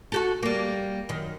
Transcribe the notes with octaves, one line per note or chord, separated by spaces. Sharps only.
F#4 G4 A4
G3 A#3
F#2 D#3